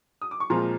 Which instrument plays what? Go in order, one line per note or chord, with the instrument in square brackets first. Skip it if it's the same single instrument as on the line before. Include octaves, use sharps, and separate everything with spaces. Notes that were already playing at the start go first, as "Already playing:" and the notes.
[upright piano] D#6
D6
C#6
A#2 F3 G#3 C4 F4 A#5 C6